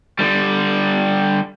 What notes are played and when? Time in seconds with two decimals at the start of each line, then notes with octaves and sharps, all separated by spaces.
0.19 D3 G3